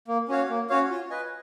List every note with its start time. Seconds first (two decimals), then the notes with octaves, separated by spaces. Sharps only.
0.08 A#3
0.29 C#4 F#4 C#5 F5
0.49 A#3
0.69 C#4 F#4 C#5 F5
0.90 F4
1.10 B4 D#5 G#5